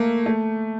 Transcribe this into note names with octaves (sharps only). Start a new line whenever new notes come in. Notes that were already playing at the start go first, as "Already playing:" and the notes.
Already playing: A3 A#3
A3